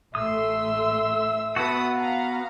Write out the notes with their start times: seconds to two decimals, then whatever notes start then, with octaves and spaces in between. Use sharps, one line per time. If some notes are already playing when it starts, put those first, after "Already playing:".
0.15 A1 A3 E5 C6 D#6 E6
1.56 B3 F#4 B4 A5 D#6
1.94 F5 A#5